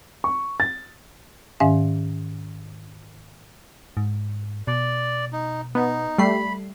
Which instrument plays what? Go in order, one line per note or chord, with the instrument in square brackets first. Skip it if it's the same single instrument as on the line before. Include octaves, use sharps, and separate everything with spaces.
[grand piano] C#6
A6
[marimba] G#2 D#3 C#4 E5 F5
[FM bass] G#2
[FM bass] B2 [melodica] D5
[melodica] D#4
[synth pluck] B3 [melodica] D#4
[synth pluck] G3 A3 C7 [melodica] B5